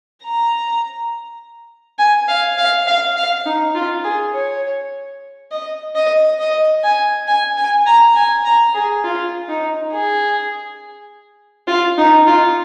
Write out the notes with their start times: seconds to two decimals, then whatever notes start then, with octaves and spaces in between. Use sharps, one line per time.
0.23 A#5
1.99 G#5
2.28 F5
2.58 F5
2.87 F5
3.16 F5
3.46 D#4
3.75 F4
4.04 G#4
4.34 C#5
5.51 D#5
5.95 D#5
6.39 D#5
6.83 G#5
7.27 G#5
7.57 G#5
7.86 A#5
8.16 G#5
8.45 A#5
8.74 G#4
9.04 F4
9.48 D#4
9.92 G#4
11.68 F4
11.98 D#4
12.27 F4